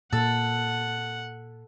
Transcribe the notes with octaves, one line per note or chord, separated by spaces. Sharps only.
A#2 A4 F#5